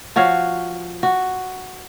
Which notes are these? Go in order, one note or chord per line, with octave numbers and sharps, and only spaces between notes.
F3 F#4 C#5 F5
F#4